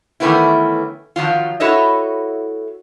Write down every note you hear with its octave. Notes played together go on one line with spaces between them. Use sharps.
D#3 E3 A3 B3 C#4 E4
D#3 F3 F#3 F4
E4 F#4 A4 C#5 D#5 E5